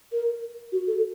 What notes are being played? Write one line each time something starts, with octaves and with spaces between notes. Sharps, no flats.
A#4
F#4
A4